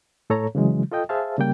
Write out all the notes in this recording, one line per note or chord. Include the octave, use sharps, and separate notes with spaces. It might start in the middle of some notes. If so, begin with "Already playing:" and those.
A2 A4 C#5 A#5
C#3 E3 F#3 G#3
F4 A4 D#5 G5
G#4 C5 E5 F5 A5
C#3 G3 A#3 G5